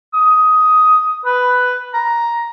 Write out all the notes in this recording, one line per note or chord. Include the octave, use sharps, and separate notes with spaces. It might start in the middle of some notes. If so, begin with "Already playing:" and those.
D#6
B4
A#5